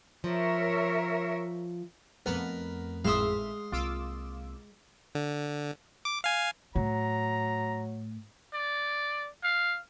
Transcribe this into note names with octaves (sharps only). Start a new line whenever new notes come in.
F3 A#4 C#5 E5
F2 A3 B3 A#4 B4
G#1 A2 G#3 E5 F5 C6 D#6
C2 A#3 F4 D6 E6
D3
D6
F5 G#5
A2 F#3 A#5
D5
F5